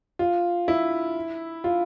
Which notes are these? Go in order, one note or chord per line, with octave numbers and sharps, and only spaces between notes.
F4
E4
F4